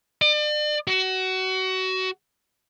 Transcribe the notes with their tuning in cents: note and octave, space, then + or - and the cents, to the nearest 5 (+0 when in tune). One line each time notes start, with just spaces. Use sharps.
D5 +40
F#4 +25